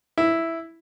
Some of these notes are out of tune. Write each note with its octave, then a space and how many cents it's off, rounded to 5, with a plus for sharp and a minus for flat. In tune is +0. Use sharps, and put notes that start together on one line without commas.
E4 +0